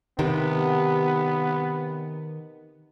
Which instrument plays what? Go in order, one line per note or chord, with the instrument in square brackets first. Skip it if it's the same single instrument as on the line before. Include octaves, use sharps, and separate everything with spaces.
[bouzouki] C3 [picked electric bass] D#3 [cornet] B3